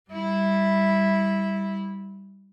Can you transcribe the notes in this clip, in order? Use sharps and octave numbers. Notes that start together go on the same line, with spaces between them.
G3 E4